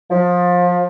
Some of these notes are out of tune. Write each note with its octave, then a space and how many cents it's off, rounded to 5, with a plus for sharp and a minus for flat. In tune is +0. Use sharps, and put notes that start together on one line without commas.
F3 +25